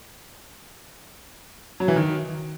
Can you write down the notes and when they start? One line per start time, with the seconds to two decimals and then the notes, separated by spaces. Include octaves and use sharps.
1.80 F#3
1.88 E3
1.96 D#3